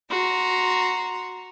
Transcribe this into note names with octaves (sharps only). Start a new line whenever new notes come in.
F#4 A#5 C6